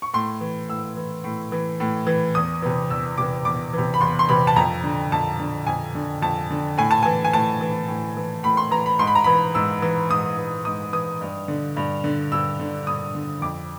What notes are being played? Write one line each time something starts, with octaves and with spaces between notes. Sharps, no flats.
C#6
A2 C6
E3
A2 E6
E3
A2
E3
A2
E3
E2 D#6
C3 E3
E2 E6
C3 E3 D6
E2 D6
C3 E3
B5
E2 C6
C6
C3 E3 B5
A5
F2 A#5
D3
F2 A5
D3
F2 G#5
D3
F2 A5
D3
A2 G#5
A5
E3 G#5
G#5
A2 A5
E3
A2
E3
A2 B5
C6
E3 A#5
B5
G#2 C6
B5
A#5
E3 B5
G#2 E6
E3
G#2 D#6
E3
G#2 D#6
E3 D#6
G2
D3
G2
D3
G2 E6
D3
G2 D#6
D3
F2 D6